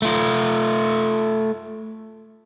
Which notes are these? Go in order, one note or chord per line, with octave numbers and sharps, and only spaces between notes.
A3 F4